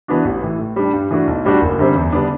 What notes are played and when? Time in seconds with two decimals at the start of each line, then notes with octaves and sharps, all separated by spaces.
0.08 E3 B3 D4 F#4
0.25 A1
0.42 A2 E3
0.59 A2
0.76 G3 D4
0.93 G2
1.11 E3 A3 D4 F#4
1.27 B1
1.45 A2 G3 D4 F#4
1.61 F#1
1.79 F#2 D3 G3 C4
1.95 E2
2.13 D3 G3 B3 D4